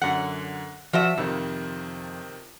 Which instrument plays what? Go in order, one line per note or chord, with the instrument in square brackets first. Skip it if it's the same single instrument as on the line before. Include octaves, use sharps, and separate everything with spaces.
[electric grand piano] F#2 D3 F#6 [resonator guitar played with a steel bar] F#5
[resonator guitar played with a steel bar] F3 F#4 E5 [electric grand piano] D5
[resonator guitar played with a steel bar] F2 [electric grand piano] C3 D#3 F3